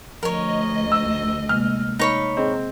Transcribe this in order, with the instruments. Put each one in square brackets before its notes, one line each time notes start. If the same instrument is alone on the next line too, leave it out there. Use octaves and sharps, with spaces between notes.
[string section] D2 D#5 [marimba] F3 [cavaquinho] A#4 C#5
[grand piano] E6
[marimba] C3 G#3 A#3 [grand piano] F6
[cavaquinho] D#4 C#5 B5
[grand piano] C4 [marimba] G#4 D#5